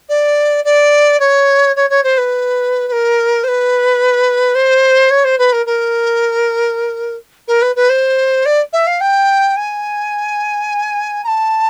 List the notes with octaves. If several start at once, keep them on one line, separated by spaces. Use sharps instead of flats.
D5
D5
C#5
C#5
C#5
C5
B4
B4
A#4
C5
B4
C5
C#5
C5
B4
A#4
A#4
A#4
B4
B4
C5
D5
E5
F5
G5
G#5
A#5
A5